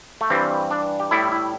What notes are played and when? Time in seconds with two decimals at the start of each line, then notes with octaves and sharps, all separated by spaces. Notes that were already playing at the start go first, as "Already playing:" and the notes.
0.21 A3
0.30 G2 E3 G3 C4
0.71 D4
1.00 G4
1.11 A2 G3 E4
1.32 E4